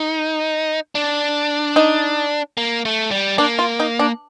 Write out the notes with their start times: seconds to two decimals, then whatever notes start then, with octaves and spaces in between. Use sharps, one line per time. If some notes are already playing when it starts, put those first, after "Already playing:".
Already playing: D#4
0.95 D4
1.76 D#4
2.57 A#3
2.85 A3
3.11 G3
3.38 A#3 D4
3.59 F4
3.80 D#4
3.99 D4